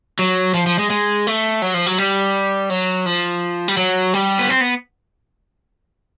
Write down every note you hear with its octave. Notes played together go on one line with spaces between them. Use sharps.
F#3
F3
F3
G#3
G#3
A3
F#3
F3
F#3
G3
F#3
F3
G3
F#3
G3
B3
C4
B3